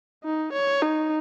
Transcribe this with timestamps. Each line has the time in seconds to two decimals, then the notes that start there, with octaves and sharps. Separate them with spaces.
0.24 D#4
0.53 C#5
0.82 D#4